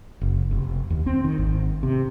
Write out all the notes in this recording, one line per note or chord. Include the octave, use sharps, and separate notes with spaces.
F#1
F1
D#2
C4
D#3
G#1
C3